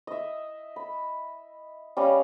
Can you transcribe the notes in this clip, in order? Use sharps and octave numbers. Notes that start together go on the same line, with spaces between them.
D#5 E5
B5
G3 C#4 D#5 F5